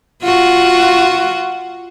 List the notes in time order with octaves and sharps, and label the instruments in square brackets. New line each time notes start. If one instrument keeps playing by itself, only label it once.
[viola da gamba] F4 F#4